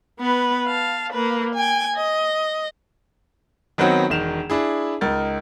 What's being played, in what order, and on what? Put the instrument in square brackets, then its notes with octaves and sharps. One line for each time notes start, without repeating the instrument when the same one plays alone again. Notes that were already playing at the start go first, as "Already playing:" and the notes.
[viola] B3 B4
F5 A5
A#3 B4
G5 G#5
D#5
[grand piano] D#3 F#3 B3 C4 F#4 C#5
E1 D#3 E7 F7
D4 E4 G#4
C#2 D#4 A#4 A6